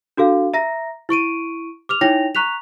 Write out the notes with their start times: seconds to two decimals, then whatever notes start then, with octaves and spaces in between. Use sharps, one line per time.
0.17 D4 F#4 A4 F5
0.54 E5 A#5 A#6
1.09 E4 C#6 D7 D#7
1.89 D6 F6 F7
2.01 D#4 E4 C#5 G5 A#6 F7
2.35 A#5 C#6 F#6 B6 F7